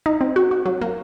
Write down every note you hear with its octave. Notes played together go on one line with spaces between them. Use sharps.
D#4
C4
F#4
F#4
F#3
A#3